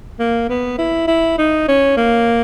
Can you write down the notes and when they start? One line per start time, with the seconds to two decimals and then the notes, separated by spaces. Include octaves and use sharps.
0.19 A#3
0.50 B3
0.78 E4
1.08 E4
1.38 D#4
1.68 C#4
1.97 A#3